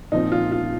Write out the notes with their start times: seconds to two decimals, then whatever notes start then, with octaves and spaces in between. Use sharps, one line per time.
0.12 A#2 F3 C4 D#4
0.32 F4
0.52 F4